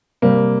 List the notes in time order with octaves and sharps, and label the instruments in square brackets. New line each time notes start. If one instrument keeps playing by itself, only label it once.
[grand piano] C3 G3 A#3